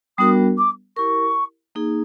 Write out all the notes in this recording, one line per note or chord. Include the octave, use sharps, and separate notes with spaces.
G3 B3 D4 F#4 A#4 D#6
D6
E4 G4 A#4 C#6
A#3 D#4 G#4